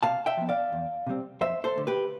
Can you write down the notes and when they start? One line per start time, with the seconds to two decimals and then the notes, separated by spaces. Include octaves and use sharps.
0.03 C3 F5 A5
0.26 E5 G5
0.37 F3 B3
0.49 D5 F5
0.72 E2
1.07 C3 G3 C4
1.41 F2 C5 E5
1.64 A4 C5
1.76 D3 A3
1.87 G4 B4